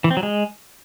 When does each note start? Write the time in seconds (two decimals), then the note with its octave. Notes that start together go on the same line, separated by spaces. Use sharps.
0.04 E3
0.11 C4
0.17 F#3
0.23 G#3